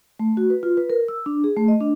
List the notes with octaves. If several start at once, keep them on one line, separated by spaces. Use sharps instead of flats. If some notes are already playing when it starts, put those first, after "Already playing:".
A3
F#4
B4
F4
B4
A#4
E6
D4
G#4
A3
D#5
D4